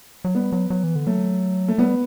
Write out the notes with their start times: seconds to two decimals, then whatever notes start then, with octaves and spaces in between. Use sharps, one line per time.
0.24 F#3
0.35 G3 B3
0.52 F#3
0.70 F#3
0.83 E3
0.95 D3
1.07 F#3 A3
1.68 A3
1.78 G3 B3